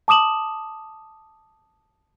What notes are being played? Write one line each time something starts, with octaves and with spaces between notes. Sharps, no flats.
A5 D6 D#6 E7 F#7